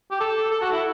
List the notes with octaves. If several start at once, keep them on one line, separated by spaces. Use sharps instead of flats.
G4
A4
A4
F#4
E4